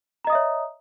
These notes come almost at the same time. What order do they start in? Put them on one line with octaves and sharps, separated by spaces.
A#5 D#5 D#6 E5 C#5